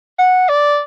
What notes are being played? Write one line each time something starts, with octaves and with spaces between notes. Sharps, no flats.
F#5
D5